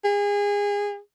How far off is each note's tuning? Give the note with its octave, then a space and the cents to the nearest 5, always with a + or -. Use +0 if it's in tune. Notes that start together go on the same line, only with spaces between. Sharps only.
G#4 -30